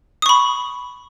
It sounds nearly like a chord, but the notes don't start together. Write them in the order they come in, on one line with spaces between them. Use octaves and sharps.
D#6 C#6 B5